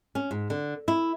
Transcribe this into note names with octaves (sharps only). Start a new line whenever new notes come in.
C#4
G#2
D3
E4